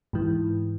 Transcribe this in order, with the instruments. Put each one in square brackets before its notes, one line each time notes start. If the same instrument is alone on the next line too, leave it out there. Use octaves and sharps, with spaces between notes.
[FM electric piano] G#2 E3